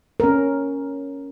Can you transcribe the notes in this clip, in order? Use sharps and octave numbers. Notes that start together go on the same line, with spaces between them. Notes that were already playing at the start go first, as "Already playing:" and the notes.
C#4 A#4